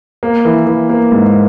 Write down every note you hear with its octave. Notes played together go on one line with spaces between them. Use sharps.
A#3
E3
E3
A#3
G#2